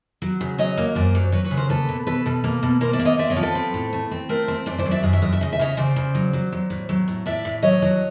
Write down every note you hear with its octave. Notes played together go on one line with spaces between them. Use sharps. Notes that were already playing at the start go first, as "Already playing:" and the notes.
F#3
C#3
F#3 C#5 D#5
A#3
F#2 C5 D5
F#3
F#3 B4 C#5
B4 C#5
C#3
A#4 C5
A#3 A4 B4
B2
B2 A4 B4
B2
A#3
B2
A#3 A#4 C5
D5 E5
A#3
C#5 D#5
C4 D5 E5
C#5 D#5
F3
A4 B4
C4
A2
A3
C4
A3 A#4 C5
C4
F#2 C5 D5
C5 D5
F#3
D5 E5
F#2 D#5
E5
F#2 D#5
E5
C#3 D#5
E5
C#3 C#5 D#5
C#3 C5 D5
C#3
F#3
F#3
F#3
A2
F#3
A2
A2 D5 E5
A2
F#3 C#5 D#5
F#3